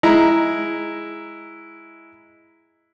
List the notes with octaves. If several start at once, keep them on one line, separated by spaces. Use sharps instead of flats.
G#3 E4 A#5